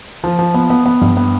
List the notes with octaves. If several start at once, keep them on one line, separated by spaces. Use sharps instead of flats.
F3
F3
B3
B3
B3
G2
B3